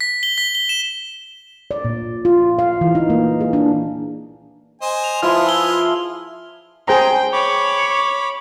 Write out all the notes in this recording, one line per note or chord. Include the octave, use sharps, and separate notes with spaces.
B6
G7
B6
G7
E7
D5
A#2
F4
F5
E3
D#4
A#3
G#4
D4
C5 D#5 G#5
F7
F3 E4 F4 G#4 B4 C6 F6
E6 G7
G#4 C5 G5 A#5
C#5 B5 D6